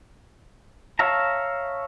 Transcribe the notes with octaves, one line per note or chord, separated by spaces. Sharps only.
C#5 E5 F5 A5 A#5